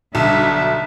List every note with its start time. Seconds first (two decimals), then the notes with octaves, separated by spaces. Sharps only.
0.15 B1 D3 G3 E5